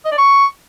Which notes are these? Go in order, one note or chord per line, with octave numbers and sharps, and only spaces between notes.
D#5
D5
C#6